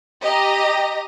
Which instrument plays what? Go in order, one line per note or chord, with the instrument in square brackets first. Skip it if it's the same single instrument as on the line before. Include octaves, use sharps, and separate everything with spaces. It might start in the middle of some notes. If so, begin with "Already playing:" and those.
[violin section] G4 D#5 A#5